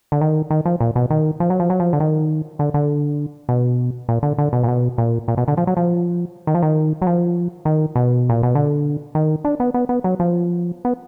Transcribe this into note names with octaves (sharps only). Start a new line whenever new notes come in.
D3
D#3
D#3
F3
A#2
B2
D#3
F3
F#3
F3
F#3
F3
D3
D#3
D3
D3
B2
A#2
D3
D3
B2
A#2
B2
A#2
A#2
B2
D3
F3
F#3
F3
D#3
F3
D#3
F#3
F3
D#3
B2
A#2
B2
D3
D#3
D4
B3
B3
B3
F#3
F3
B3